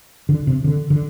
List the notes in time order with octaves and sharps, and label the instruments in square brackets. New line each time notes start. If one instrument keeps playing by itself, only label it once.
[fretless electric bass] D3
C3
D3
D3